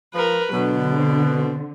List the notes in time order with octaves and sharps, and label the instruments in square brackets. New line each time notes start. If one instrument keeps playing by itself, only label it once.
[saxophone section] F3 [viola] A#4 B4
[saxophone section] B2 [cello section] D3 [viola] F#3
[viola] C4